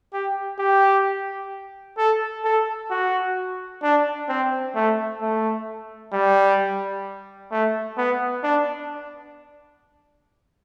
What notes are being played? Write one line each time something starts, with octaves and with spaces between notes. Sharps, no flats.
G4
G4
A4
A4
F#4
D4
C4
A3
A3
G3
A3
B3
D4